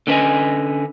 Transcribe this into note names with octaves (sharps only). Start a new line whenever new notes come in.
D3 C#4 D4 B4 D#5 G#5